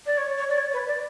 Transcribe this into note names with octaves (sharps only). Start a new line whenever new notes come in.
D5
C#5
C#5
D5
C#5
B4
D5